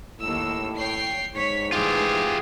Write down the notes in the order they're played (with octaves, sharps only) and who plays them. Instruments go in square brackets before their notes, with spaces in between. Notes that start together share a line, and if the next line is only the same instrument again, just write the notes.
[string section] D#2 E6 [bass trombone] A2
[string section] C#5 G5 C7
[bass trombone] G#2 [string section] C#5 B6
[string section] A2 E3 [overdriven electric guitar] F4 G4 [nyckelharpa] G#4